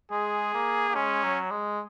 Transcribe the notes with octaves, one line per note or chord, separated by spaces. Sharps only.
G#3 G#4
A#3
A#3
G#3 C#4
F#3
G#3